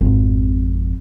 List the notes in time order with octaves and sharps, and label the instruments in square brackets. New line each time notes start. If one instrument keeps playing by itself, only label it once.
[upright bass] G#1 F2